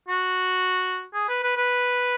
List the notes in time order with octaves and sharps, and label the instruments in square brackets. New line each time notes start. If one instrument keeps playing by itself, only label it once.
[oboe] F#4
G#4
B4
B4
B4